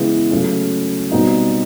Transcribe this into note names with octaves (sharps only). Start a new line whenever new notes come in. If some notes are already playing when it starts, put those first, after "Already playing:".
Already playing: C#3 E3 G#3 B3 E4
C#3 F#3 A3 C#4
B2 G3 C4 D#4